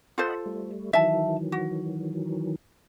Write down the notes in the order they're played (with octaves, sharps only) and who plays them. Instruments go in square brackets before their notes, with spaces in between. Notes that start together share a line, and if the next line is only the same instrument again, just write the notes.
[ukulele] F4 A4 C5 [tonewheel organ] D#5 F#5 B5
[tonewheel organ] G3 A3
[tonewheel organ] D#3 E3 F#3 [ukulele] E5 A5
[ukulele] F#4